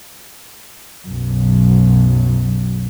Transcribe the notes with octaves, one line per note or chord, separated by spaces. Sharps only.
B1 F#2